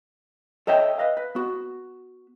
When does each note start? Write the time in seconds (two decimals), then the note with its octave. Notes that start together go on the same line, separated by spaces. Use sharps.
0.67 A4 C#5 D#5 E5 G5
0.98 B4 D#5 F5
1.17 B4
1.35 B3 F#4